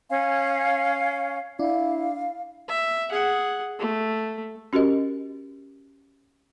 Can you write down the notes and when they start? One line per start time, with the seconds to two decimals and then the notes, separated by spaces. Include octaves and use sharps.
0.09 C#4 F5 G#5
1.59 D4 E4 F5
2.68 E5
3.11 G#4 F#5
3.79 A3
4.73 C#4 F#4 G4 A#4 D#5